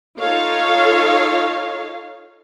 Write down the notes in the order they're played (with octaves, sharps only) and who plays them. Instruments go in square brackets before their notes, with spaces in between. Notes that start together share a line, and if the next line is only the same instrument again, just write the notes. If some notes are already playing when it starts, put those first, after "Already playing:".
[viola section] D#4 F4 A4 C#5 F5